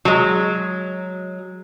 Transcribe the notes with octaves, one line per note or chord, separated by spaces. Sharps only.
F#3 G#3